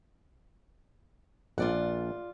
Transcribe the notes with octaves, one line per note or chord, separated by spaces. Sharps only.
A#1 F4 D5 F#5